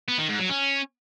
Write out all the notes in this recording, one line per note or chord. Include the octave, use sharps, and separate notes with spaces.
B3
D#3
G#2
F#3
C#4